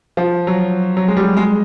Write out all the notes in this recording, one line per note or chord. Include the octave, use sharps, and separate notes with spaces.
F3
F#3
F#3
G#3
G3
G#3